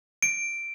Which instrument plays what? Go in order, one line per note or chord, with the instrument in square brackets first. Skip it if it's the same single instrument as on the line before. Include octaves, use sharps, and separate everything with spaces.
[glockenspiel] D7